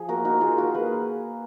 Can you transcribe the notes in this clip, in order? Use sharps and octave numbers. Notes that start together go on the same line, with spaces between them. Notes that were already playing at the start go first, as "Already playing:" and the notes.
Already playing: F3 G#4
A#3 F#4 A#4
D#4 F#4 A#4
A#3 F4 G#4
D#4 F#4 A#4
A#3 G#4 B4